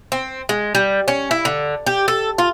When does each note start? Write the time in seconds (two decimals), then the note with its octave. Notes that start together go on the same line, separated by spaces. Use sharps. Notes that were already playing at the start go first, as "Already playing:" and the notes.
0.12 C4
0.49 G#3
0.75 G3
1.08 C#4
1.31 E4
1.45 D3
1.86 G4
2.08 A4
2.38 F4